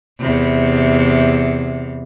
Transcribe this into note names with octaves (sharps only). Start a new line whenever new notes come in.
E2 C3